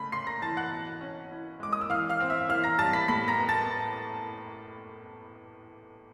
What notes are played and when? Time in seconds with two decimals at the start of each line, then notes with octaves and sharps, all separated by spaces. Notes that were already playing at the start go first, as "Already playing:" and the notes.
Already playing: C#3 A3 B5 B6
0.12 C#3 C6 C7
0.27 A#5 A#6
0.42 E3 A5 A6
0.57 F#5 F#6
0.71 B2
1.01 C#4
1.31 E4
1.60 G#3 D6
1.73 D#6
1.81 E6
1.90 E3 F5 F6
2.09 F5 F6
2.20 C4
2.30 E5 E6
2.49 E3 F5 F6
2.64 A#5 A#6
2.79 G3 A5 A6
2.93 B5 B6
3.08 A2 B5 B6
3.28 A#5 A#6
3.39 B3
3.49 A5 A6